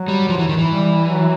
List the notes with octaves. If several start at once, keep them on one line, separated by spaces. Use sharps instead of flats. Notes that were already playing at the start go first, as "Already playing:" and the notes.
Already playing: F#3
G3
F3
E3
D#3
E3
G3
F#3